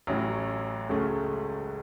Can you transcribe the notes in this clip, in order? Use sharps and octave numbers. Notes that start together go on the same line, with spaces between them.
A1 A2 F#3 C#4 E4
C#2 C#3 F#3 A3 C#4